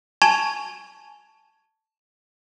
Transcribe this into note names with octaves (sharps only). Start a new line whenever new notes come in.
G#5 A5 C#6 G#6 E7 F7